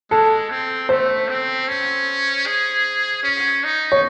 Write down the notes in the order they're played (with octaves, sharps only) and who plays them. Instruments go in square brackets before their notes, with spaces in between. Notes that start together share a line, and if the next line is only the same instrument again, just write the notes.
[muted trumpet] G#3 [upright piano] A4
[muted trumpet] C4
[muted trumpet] A3 [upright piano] C5
[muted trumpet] C4
C#4
G#4
C#4
D#4
[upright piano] C#5